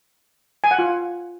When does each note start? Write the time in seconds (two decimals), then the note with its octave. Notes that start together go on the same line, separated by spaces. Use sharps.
0.64 G#5
0.71 F#5
0.79 F4